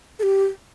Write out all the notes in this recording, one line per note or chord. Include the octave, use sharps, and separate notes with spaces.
A4
G4